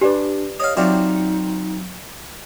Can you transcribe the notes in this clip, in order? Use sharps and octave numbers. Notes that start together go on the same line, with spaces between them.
D4 G4 B4 D5 G#5
C#5 D#5 F5
F#3 C4 D#4 F4 D5 E5 G5